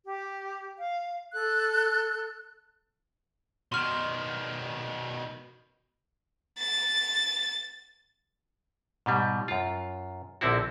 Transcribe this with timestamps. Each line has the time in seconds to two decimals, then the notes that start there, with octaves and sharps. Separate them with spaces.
0.05 G4
0.78 F5
1.33 A4 F#6
3.72 B2 D#3 C6 C#6 F6
6.59 A6
9.06 G#2 B2 G3
9.48 F#2 F4
10.41 A#1 D3 C4 E4 F#4